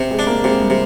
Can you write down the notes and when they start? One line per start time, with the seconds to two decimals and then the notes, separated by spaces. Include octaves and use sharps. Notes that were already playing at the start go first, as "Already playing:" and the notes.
Already playing: C3
0.11 G#3
0.19 D4
0.27 A#3
0.44 C3 G#3
0.61 G3
0.70 C3